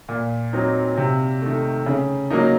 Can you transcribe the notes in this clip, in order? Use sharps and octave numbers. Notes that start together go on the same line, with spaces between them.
A#2
F#3 C4 D#4
C3
D#3 A3
C#3
F#3 A#3 D#4